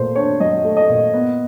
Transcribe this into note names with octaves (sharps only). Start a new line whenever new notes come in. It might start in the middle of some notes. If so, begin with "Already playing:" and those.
Already playing: A#2 A3 C5
D4 C#5
F#3 D#5
A3
D#5
A#2
B3